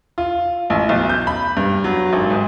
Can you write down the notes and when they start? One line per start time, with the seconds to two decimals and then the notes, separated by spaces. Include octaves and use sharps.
0.18 F4
0.70 A1
0.89 B1
1.09 G6
1.27 B5
1.57 G2
1.84 F#3
2.13 G#1
2.30 G#2